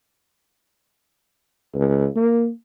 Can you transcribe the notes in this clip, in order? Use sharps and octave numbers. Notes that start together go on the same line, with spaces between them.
C#2
A#3